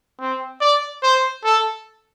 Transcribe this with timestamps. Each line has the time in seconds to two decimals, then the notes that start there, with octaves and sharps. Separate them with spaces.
0.20 C4
0.61 D5
1.03 C5
1.44 A4